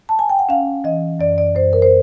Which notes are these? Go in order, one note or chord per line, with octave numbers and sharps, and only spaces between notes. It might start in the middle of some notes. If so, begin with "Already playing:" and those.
A5
G#5
G5
F#5
C#4 F5
E3 D#5
F#2 D5
D5
F#2 C5
A#4
C5